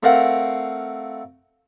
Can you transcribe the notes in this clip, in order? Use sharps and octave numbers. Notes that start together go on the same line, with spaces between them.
A3 C4 A#4 F5 F#5